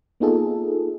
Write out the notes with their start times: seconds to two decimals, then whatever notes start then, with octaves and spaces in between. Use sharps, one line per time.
0.20 A#3 B3 D#4 F4 G#4 A4